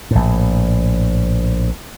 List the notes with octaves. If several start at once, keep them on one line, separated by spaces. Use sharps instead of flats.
A#1 A2